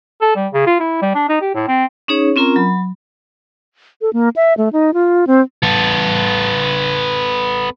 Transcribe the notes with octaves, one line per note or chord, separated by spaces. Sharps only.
A4
G3
C#3
F4
E4
G3
D4
D#4
G4
A2
C4
C#4 D#4 G#4 C#5
C4 C#4 F4 A#4 A#5
F#3 B5
A4
A#3
E5
A3
D#4
F4
C4
B3 A4